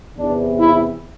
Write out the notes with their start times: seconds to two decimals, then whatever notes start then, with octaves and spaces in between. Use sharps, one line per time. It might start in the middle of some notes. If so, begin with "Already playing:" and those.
0.18 E2 C3 E3 D4
0.59 E4